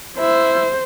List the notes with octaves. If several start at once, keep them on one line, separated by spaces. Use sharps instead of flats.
E4 C5